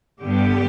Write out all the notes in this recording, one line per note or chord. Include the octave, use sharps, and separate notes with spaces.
G2 D3 G3 B3 G4